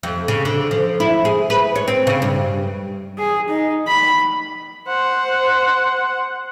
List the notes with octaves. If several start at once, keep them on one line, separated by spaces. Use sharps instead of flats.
F2
C#3
D3
F3
E4
G#4
B4
C#5
C4
C#3
G2
G#4
D#4
B5
C5 F#5